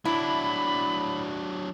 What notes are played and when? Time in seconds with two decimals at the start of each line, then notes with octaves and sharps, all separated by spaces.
0.05 F#3 D4 E4 B5